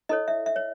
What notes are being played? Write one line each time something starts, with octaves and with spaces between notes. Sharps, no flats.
E4 A4 C#5 D#5
E5
E5
C#5